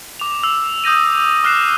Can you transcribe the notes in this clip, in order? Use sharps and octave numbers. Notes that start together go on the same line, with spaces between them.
D6 F7
E6 F7
D#6 G6 A#6 D#7
D6 F6 F#6 C7 E7